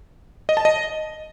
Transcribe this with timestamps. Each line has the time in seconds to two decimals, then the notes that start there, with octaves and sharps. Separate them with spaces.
0.49 D#5
0.57 A5
0.65 D#5